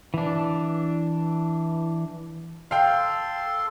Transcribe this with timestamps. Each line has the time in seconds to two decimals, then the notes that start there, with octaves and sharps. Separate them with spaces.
0.14 E3 D4
2.71 A4 F5 G5 C6